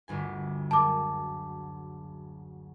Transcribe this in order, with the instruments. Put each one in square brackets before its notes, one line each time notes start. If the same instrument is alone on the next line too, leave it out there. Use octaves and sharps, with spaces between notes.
[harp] G1 D2 G#5
[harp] F#1 [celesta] A5 D6